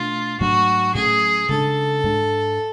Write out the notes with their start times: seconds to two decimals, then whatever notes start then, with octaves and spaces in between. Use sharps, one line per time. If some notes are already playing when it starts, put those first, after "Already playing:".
Already playing: B2 A3 D4 F4
0.40 G#2 F#3 A3 D4 F#4
0.95 A2 F#3 A3 C#4 G#4
1.49 C#3 G#3 B3 D4 A4
2.04 G#2 G#3 D4